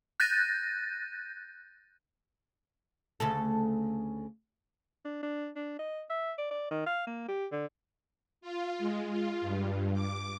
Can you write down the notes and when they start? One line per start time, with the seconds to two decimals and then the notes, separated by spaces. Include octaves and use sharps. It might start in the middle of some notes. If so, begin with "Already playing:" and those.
0.20 F#6 G6 A6 A#6 D#7
3.20 D2 C#3 A4
5.05 D4
5.23 D4
5.56 D4
5.79 D#5
6.10 E5
6.38 D5
6.51 D5
6.71 D#3
6.86 F5
7.07 A#3
7.28 G4
7.52 D3
8.41 F4
8.78 G#3
9.10 F4
9.41 G2
9.93 D6